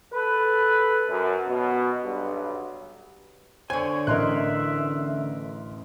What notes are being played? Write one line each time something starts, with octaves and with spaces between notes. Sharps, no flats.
A4 B4
F#2
B2
B1 G2
D3 C5 C#5 G#5
A1 A#4 D#5 E5 C6 F#6